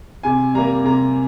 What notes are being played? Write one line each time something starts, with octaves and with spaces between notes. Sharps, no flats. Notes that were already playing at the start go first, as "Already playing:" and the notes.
C3 G#5
G3 A#3 A#5
C3 A#5